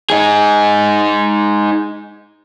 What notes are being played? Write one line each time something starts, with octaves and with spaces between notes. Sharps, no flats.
D#4 G#4